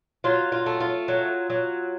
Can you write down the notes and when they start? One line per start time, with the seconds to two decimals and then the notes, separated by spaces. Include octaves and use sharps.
0.24 F#3 F4
0.52 F4
0.66 A3
0.80 F4
1.08 F#3
1.50 F#3